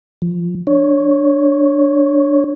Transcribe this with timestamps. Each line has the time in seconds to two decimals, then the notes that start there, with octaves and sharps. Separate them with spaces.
0.22 F3
0.67 D4 C#5